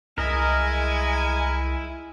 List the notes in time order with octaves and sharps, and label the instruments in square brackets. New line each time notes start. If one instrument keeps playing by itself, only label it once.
[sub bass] C2 [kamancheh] G#3 G#5 [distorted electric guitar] E4 [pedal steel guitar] A#4 D#5